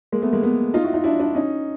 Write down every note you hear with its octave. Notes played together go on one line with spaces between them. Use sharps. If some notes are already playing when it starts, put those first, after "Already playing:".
G#3 A#3
A3 B3
G#3 A#3
A3 B3
D#4 F4
E4 F#4
D#4 F4
D4 E4
D4 E4
C#4 D#4